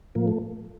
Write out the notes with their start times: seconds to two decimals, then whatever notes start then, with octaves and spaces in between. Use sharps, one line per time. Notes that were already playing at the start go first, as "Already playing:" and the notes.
0.15 A2 F3 A#3
0.28 A3